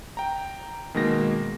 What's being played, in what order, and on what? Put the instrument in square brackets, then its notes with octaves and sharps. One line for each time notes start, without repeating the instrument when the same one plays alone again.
[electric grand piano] G5 A#5
B2 D#3 G#3 A#3 A#6